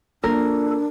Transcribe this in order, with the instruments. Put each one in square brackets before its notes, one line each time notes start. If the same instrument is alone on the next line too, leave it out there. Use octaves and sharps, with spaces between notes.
[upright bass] A#3 F4 [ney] D4 [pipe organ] A4 [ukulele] A#4